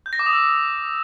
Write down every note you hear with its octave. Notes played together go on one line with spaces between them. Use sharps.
G6
A#6
D6
D#6
E6